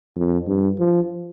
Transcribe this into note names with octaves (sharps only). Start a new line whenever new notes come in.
F2
G2
F3